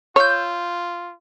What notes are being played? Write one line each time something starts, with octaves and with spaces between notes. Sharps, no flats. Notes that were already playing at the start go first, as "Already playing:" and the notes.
F4 C#5 E6 F6 G6